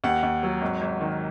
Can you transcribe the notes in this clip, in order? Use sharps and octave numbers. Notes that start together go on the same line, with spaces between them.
D#2 F#5
D#2
F#3
G#1
G#1
D#3